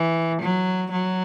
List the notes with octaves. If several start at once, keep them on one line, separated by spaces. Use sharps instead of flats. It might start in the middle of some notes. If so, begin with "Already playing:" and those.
Already playing: E3
F#3
F#3